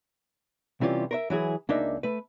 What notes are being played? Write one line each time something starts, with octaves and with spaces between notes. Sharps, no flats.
C3 E3 G3 C#4 F4 G4
A#4 C5 E5
E3 F#3 E4 G#4
C#2 A#3 D4 D#4 E5
A3 B4